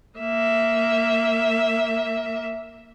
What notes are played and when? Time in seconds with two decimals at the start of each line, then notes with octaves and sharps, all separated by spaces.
0.19 A#3 E5